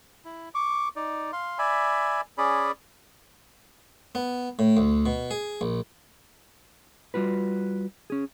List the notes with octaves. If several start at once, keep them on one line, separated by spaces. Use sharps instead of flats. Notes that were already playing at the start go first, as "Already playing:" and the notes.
E4
C#6 D6
D#4 D5
F5 C6
D5 E5 G#5 B5
C#4 G#4 D5 B5
B3
A2
D2
B2
G#4
A#1
G3 F4 F#4 B4
C#4 G#4